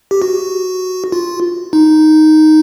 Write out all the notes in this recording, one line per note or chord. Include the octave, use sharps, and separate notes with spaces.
G4
F#4
F4
D#4